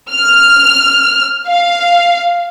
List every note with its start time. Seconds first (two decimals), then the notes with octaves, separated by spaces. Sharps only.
0.11 F6
1.47 F5